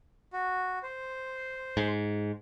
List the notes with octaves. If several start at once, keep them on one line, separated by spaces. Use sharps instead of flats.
F#4
C5
G#2